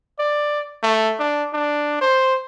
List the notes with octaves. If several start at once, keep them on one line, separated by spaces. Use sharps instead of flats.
D5
A3
D4
D4
C5